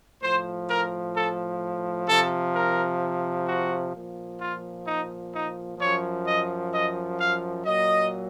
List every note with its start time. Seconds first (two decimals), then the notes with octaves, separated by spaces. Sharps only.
0.21 A2 F3 C5
0.68 A#4
1.14 A4
2.07 C3 F3 A4
2.54 A#4
3.46 F#4
3.94 A#2 F3
4.39 F4
4.86 D#4
5.33 D#4
5.79 F#2 F3 C#5
6.25 D#5
6.72 D#5
7.19 F5
7.65 A#2 F#3 D#5